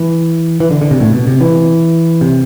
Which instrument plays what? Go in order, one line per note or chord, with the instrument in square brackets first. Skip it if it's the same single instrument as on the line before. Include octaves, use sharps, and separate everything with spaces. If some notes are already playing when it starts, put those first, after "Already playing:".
Already playing: [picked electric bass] E3
E3
D3
D3
C3
A2
B2
C3
E3
C3